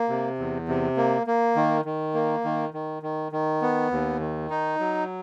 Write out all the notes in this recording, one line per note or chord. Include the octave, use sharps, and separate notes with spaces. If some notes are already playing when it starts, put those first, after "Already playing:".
Already playing: A#3
C3
E2
C3
A#3
A#3
D#3
D#3
A#3
D#3
D#3
D#3
D#3
B3
D#2
D#3
D#4
F#3